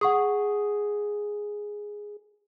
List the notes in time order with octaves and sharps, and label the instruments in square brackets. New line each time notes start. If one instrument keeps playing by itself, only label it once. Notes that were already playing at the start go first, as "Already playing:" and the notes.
[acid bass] G#4 [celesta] F#5 C#6 D#6